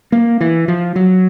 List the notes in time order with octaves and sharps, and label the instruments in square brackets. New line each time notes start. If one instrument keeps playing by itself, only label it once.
[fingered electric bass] A#3
E3
F3
F#3